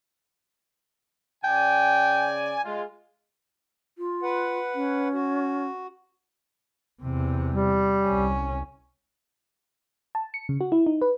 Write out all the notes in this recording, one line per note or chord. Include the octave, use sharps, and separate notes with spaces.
C#3 D5 G5 G#5
G#3 F4
F4
B4 F#5
C#4
F#4
E2 C3
G3
C2 C#4
A5
C#7
C#3
F#4
E4
D#4
B4